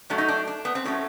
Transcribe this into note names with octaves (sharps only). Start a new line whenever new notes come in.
A2 F#3 A3 D4
D#4
D4
D4
B3
C4
A2 F#3 A3 C#4